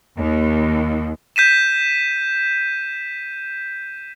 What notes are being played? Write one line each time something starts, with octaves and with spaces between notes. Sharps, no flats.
D#2
G6 B6 D#7 E7